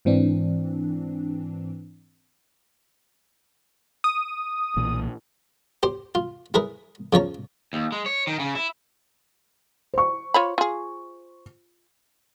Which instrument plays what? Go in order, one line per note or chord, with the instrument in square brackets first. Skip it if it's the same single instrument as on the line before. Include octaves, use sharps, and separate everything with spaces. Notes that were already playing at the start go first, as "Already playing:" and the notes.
[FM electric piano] G#2 E3 C4 D4
[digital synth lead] D#6
[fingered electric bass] B1 A#2 E3
[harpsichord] G4 C5
F4
E4 G#4 A#4 B4
C#3 F3 C#5 A#5
[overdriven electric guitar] D#2
G#3
C#5
D#3
C#3
E4
[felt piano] C5 C#6
[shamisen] F4 C#5 B5
F4 G#4